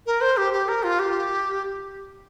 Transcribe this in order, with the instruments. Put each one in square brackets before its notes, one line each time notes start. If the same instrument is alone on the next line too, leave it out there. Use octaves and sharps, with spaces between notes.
[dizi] A#4
C5
G4
G4
A#4
F4
G4